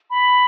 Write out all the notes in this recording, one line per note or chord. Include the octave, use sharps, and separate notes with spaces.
B5